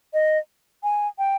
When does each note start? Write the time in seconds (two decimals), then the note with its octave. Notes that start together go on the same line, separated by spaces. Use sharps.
0.14 D#5
0.83 G#5
1.18 G5